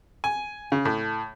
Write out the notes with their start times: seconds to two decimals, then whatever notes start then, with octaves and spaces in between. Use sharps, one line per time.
0.24 G#5
0.72 C#3
0.85 A2